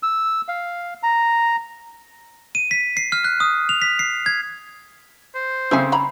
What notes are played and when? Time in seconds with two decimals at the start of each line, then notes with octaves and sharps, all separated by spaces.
0.03 E6
0.48 F5
1.03 A#5
2.55 D#7
2.71 B6
2.97 C7
3.12 F6
3.24 F#6
3.40 D#6
3.69 F7
3.82 B6
3.99 C7
4.26 G#6
5.35 C5
5.71 C#3 C4 A4 E5 G#5
5.92 C#4 A#5 B5